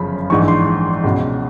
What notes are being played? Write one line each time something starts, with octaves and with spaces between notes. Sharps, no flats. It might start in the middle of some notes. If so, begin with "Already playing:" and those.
Already playing: G1 F#2 C#3 F3 B5
A#1 G#2 E3 C#6
C6
C#2 B2